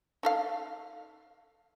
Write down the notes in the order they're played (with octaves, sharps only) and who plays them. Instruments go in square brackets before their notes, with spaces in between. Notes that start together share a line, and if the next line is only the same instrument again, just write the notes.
[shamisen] D#4 A4 F5